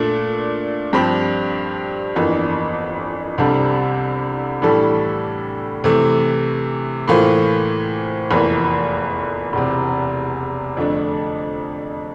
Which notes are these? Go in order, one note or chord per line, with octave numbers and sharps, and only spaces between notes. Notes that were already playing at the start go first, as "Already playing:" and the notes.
Already playing: A#2 A3 D4
G2 F3 C4 G4
G1 F2 E3 A#3 D4
C2 C3 G3 D4 A4
A2 E3 G3 D4 A4
C3 E3 A3
A2 E3 A#3 F4 C5
F1 E2 E3 A#3
E1 E2 C3
F2 D3 A3 D4